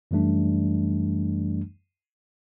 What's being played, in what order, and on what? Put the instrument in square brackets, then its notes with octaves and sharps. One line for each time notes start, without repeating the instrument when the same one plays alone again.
[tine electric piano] F#2 E3 G3 A3 D4